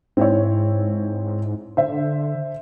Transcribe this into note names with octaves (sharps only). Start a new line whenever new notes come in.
G#2 C4 E4 C#5
D3 C5 E5